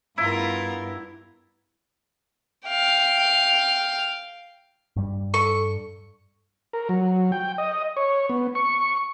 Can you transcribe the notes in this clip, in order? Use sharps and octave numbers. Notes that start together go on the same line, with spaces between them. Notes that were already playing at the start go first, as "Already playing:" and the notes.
G2 B3 E4 F4 A#4
F5 G5
G2 G3
A4 C#6
A#4
F#3
G5
D#5
C#5
B3
C#6